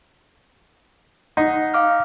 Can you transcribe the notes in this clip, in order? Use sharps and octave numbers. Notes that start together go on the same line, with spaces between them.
D#4 F#5
F5 D6 F6